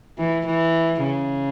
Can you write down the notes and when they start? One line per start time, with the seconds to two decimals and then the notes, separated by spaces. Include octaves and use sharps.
0.18 E3
0.46 E3
1.03 C#3